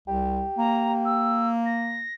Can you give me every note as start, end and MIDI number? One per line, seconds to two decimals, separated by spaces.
0.08 0.44 36
0.08 1.53 67
0.58 2.04 58
0.58 0.93 82
1.05 1.49 88
1.66 2.14 94